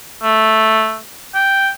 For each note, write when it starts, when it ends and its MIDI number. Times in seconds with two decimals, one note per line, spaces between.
0.23 0.98 57
1.35 1.70 79